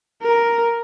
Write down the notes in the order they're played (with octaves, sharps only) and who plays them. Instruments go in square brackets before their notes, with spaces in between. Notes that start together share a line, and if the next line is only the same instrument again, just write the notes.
[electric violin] A#4